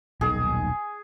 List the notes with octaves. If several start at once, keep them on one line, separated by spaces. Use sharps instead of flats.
D#1 B1 D#3 G#4